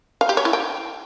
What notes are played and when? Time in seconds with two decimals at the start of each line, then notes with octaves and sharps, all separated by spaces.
0.21 F5
0.29 G4
0.37 C#5
0.45 E4
0.53 G5